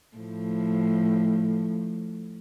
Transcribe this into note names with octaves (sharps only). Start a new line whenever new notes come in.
A2 F3